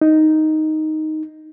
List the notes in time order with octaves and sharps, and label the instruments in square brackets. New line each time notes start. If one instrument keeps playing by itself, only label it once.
[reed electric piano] D#4